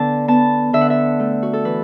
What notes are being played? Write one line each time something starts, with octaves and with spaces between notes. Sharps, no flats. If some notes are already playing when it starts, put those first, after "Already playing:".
Already playing: D3 B3 F#5 A5
B3 A5
D3 E5
F#5
E5
A3
F#4
A4
E3 B4